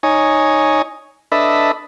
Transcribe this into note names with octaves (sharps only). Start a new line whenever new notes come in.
D#4 C#5 G#5
D4 A4 B4 D#5 E5 B5